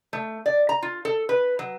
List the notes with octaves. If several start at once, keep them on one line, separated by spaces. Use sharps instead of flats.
A3
D5
A#5
F4
A4
B4
F#3